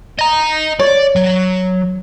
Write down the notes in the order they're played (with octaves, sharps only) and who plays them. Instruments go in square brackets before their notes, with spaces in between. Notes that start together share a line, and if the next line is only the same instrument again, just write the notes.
[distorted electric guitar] D#5 A#5
[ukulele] C#5 [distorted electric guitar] D5
[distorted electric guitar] F#3